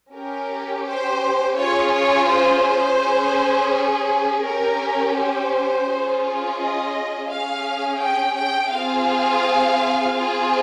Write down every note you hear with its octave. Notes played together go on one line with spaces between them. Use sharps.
C#4 G4 A#4
C5
C#4 F4 G#4 C#5
C#5
C5
C#4 G#4
C#4 G4 A#4
C5
C#4 F4 G#4
D#5
C#4 G#4 F5
G5
G5
C4 F4 G#4 F5
C4 F4 G#4